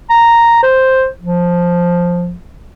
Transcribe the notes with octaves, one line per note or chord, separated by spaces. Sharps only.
A#5
C5
F3